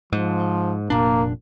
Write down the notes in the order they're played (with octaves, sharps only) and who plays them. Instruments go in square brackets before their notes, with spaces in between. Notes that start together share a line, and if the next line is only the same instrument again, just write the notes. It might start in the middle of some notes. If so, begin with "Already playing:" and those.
[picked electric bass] G#2 [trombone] F3
[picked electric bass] F1 A#2 D4 [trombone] A#3